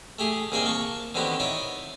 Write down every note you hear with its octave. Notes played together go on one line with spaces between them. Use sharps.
A3 G4 G#4
C2 D#3 A#3 G#4 E5 G5
A#3 A5 C#6
D3 D#3 B3 C4 F#4 G4
D#4 E4 C#5 D5